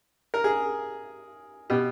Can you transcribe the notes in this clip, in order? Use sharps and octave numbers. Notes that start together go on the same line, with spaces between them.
A#4
G#4
B2 G4